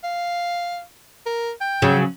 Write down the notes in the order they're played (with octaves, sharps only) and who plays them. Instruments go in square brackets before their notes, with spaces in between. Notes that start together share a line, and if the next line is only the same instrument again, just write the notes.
[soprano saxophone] F5
A#4
G5
[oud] C#3 F#3